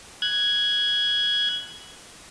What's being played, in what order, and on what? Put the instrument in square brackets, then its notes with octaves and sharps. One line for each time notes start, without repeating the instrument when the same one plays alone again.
[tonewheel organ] F#6 G#6